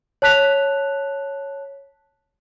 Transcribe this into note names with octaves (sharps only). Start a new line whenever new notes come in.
C#5 A5 F#6 B6 F7